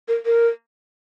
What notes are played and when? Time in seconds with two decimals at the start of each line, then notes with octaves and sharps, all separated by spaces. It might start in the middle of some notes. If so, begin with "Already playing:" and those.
0.08 A#4
0.26 A#4